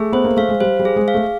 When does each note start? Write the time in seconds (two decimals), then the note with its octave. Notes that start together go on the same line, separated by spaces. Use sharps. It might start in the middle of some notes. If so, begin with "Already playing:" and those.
Already playing: A3 G#4
0.12 B3 C5
0.24 A#3
0.37 A3 F5
0.49 G#3
0.60 G3 C5
0.79 G3
0.85 G#4
0.96 G#3
1.08 F5
1.14 A3